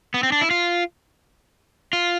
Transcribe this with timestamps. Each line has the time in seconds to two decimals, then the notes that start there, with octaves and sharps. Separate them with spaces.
0.14 B3
0.23 C4
0.32 D4
0.41 E4
0.51 F4
1.93 F4